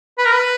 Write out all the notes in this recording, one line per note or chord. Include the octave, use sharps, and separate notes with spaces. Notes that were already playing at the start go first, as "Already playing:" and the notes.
B4
A#4
B4